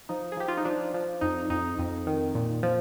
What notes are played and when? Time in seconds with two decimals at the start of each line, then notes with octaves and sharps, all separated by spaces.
0.09 F3 D#4
0.32 G#4
0.37 F3 G4
0.48 F4
0.57 D#4
0.65 F3 D4
0.94 F3
1.21 F2 D#4
1.50 F2 D#4
1.79 F2
2.07 D#3
2.35 A#2
2.63 F3